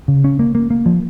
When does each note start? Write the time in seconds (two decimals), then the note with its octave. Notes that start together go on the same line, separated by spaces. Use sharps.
0.08 C#3
0.24 C#4
0.39 A#3
0.55 A#3
0.70 A#3
0.86 F3